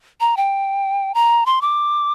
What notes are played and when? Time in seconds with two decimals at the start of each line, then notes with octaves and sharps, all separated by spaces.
0.21 A#5
0.37 G5
1.14 A#5
1.46 C6
1.61 D6